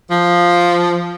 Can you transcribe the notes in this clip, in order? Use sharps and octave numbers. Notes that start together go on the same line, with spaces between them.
F3